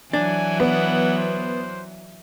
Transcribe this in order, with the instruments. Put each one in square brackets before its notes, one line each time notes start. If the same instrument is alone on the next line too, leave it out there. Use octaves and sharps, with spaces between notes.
[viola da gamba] E3 F#3 [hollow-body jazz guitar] D4 [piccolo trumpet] G#5
[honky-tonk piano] B3 [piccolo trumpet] F#5
[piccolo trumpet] C5